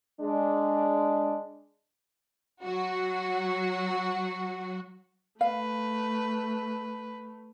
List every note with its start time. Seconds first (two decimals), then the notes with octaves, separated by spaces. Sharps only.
0.21 G#3 D4
2.63 F#3 F#4
5.41 A3 B4 F5